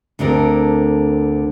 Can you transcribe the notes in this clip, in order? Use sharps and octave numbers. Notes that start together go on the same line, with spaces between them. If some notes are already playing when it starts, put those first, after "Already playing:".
D2 D3 C4 D4 A#4